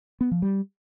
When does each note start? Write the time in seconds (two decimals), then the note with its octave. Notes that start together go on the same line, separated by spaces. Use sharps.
0.21 B3
0.31 F3
0.42 G3